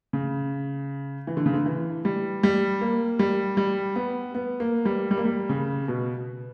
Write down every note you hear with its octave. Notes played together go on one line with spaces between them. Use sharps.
C#3
E3
D3
C#3
D3
E3
G3
G3
A#3
G3
G3
B3
B3
A#3
G3
G3
A#3
G3
C#3
B2